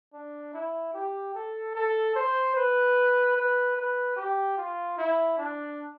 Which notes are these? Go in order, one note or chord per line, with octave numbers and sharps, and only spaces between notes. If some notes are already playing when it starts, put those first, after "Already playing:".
D4
E4
G4
A4
A4
C5
B4
B4
B4
G4
F4
E4
D4